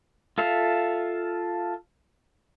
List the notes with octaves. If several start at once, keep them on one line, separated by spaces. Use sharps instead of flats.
F4 A4 E5 F5